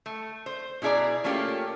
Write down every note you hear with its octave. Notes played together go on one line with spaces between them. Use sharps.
A3
C5
B2 E4 G#4 D5 A#5
A3 A#3 C#4 F4 G4